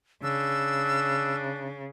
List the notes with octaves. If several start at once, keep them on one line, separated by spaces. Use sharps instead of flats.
C#3 D4 E6